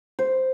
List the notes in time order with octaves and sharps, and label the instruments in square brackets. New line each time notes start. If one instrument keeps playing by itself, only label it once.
[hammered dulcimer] C5